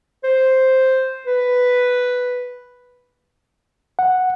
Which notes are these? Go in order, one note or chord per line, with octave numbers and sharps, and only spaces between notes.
C5
B4
F#5